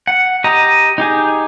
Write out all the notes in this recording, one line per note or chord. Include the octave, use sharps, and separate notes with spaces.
F#5
G4 D#5 A#5
D#4 G4 G#4